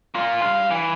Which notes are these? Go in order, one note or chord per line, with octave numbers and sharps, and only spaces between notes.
A#3 F4
G2 F5
E3